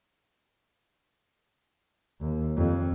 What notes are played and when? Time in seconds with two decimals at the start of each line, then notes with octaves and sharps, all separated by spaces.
2.21 D#2
2.57 F2